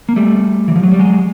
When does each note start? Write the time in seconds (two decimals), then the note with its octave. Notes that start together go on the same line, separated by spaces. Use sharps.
0.09 A#3
0.16 G3 A3
0.68 E3
0.76 F3
0.83 F#3
0.92 G3
0.99 F#3 G#3